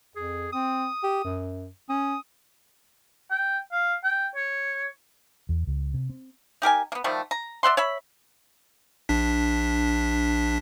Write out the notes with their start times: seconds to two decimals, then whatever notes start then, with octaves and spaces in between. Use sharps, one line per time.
0.16 F2 G#4
0.53 C4 D#6
1.03 G4
1.24 F#2
1.89 C#4 D#6
3.31 G5
3.72 F5
4.04 G5
4.36 C#5
5.49 E2
5.67 C#2
5.94 C3
6.09 C4
6.62 D#4 G4 A#4 G#5
6.92 A#3 B3
7.04 D#3 F3 G3 A3
7.31 A#5
7.63 D5 E5 F#5 C6
7.77 C#5 E5 B5
9.09 A#1 D4 B6